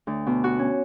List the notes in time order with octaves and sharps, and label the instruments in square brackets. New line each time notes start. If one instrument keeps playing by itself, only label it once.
[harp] D2
B2
F#4
C#4